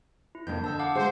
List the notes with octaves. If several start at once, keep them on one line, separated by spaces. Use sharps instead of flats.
E4
F2 C3 A#3 D4 G6
D3 A5 E6 G6
F5 F#5 D6
G#3 G#4 C5 F#5